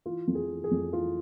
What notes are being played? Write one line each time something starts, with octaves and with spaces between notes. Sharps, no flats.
E3 F4
F2
G#4
E3
G#4
F2
E3 F4